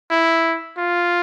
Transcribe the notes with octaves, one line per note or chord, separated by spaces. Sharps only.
E4
F4